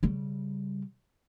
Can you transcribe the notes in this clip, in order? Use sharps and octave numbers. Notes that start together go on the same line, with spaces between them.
C#3 G3